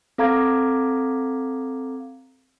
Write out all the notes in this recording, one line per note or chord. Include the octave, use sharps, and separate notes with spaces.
C4 A4 F5 A#5 D6 G#6